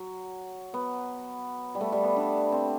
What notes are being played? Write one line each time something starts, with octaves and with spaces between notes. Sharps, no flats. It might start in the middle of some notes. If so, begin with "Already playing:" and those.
Already playing: F#3
B3
G3
A3
G3
B3
D4
C4